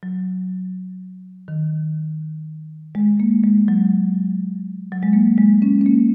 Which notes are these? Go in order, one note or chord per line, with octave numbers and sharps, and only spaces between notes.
F#3
D#3
G#3
A#3
G#3
F#3
F#3
G#3
A#3
G#3
C#4
C#4
A#3